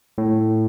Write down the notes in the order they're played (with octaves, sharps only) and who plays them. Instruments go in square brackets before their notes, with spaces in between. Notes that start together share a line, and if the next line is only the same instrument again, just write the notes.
[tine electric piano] A2